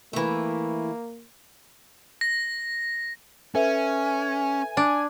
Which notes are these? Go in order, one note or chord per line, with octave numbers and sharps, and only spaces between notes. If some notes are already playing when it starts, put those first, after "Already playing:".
E3 A3 A#3
A#6
C#4 A4 B4 E5 G#5
D4